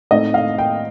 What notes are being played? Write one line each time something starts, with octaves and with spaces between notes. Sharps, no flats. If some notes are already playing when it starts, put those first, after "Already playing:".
A2 A3 C4 D#4 D#5
F5
G5